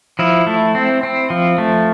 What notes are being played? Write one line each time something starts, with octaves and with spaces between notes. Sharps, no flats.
F3 E4
A3
C4
C4
F3
A3